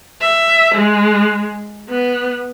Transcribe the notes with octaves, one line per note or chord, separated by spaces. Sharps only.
E5
G#3
B3